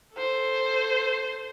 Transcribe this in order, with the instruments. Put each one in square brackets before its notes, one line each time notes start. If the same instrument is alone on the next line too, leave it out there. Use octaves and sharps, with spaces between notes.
[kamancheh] A4 C5